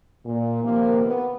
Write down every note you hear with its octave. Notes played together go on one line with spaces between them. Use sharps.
A#2
C3 D#3 F3 A#3
B3